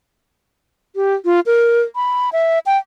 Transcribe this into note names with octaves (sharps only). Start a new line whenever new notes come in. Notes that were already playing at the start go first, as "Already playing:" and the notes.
G4
F4
A#4
B5
E5
G5